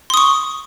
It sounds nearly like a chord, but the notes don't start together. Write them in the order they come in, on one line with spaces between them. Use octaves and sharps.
C6 D#6 C#6